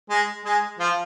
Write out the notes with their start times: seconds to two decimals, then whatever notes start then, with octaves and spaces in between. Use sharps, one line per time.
0.10 G#3 G#4
0.45 G#3 G#4
0.79 F3 F4